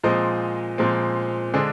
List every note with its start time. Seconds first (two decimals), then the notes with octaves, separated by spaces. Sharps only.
0.03 A#2 F3 G#3 C4 C5 D#5
0.78 A#2 F3 G#3 C4
1.54 D3 G#3 D4 G#4 C5